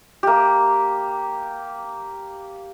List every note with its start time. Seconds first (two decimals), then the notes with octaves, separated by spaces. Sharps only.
0.23 A#3 G4